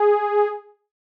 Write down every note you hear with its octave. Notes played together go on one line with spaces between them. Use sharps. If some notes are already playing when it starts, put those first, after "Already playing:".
Already playing: G#4